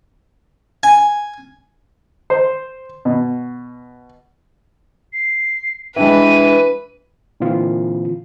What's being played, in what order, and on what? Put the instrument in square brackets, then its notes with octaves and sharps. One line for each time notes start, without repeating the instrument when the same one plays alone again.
[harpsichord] G#5
[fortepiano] C5
B2
[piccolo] C7
[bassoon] E3 [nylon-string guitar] G#3 D4 G5 [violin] B4 [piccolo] D#7
[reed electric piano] A#2 D3 E3 C4 F4